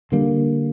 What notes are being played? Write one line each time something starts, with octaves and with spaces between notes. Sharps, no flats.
D3 G3 A#3